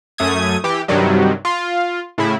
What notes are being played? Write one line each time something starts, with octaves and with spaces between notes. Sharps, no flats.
F#2 A3 D#6 G#6
E3 G4
G2 C3 D#3 F#3 G3
F4
A2 C#3 E4